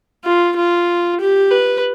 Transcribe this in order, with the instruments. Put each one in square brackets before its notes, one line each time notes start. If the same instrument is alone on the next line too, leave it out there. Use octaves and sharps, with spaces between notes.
[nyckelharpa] F4
F4
G4
B4